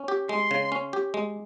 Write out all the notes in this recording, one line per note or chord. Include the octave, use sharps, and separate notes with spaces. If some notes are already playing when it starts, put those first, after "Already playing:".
Already playing: C#4
G4
G#3 C6
C#3
C#4
G4
G#3